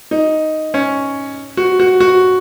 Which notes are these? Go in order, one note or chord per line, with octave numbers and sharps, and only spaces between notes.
D#4
C#4
F#4
F#4
F#4